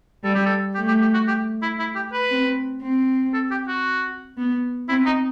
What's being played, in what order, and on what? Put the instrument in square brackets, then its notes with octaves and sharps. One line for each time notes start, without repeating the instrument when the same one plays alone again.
[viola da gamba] G3 [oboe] A4
[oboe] G4
A4
[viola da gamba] A3 [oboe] G4
[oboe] G4
G4
F#4
G4
E4
E4
G4
B4
[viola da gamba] C4
C4
[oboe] A4
G4
F#4
[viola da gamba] B3
[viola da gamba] C4 [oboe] E4
[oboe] D#4